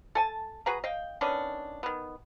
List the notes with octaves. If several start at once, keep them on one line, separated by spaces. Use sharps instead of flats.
A4 G#5 A5
F#4 G#4 B4 A#5
D#5 F5 G5
D#3 B3 C#4 D4
D#3 B3